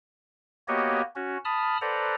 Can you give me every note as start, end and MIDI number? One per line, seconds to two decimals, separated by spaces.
0.68 1.02 58
0.68 1.02 59
0.68 1.02 66
0.68 1.02 67
0.68 1.02 73
0.68 1.02 75
1.16 1.38 61
1.16 1.38 66
1.45 1.78 81
1.45 1.78 83
1.45 1.78 87
1.45 1.78 89
1.81 2.15 69
1.81 2.15 71
1.81 2.15 72
1.81 2.15 74
1.81 2.15 78
1.81 2.15 82